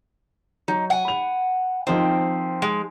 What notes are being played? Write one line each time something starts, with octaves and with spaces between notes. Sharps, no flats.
F#3 D#4
F#5 G#5
B5 F7
D#3 F3 C4 D#4
G#3